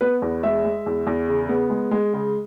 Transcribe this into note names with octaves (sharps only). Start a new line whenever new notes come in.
B3 B4
E2
G#3 E5
G#3
E2
E2
C#3
B3
G#3
G#3
C#3